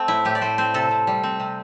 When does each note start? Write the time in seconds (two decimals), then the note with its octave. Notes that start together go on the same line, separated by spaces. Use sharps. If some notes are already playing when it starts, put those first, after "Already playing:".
Already playing: A3 C4
0.08 A2 E4
0.25 A2 G4
0.35 D5
0.41 A3 C5
0.58 C4 C5
0.74 C3 A4
0.91 C3
1.07 G3
1.23 C4
1.40 C3